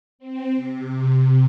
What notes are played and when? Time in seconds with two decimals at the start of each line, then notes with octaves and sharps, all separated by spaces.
0.19 C4
0.56 C3